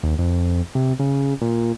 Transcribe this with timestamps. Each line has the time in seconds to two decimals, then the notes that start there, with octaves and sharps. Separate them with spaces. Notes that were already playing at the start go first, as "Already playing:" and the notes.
0.03 D#2
0.19 F2
0.75 C3
0.99 C#3
1.41 A#2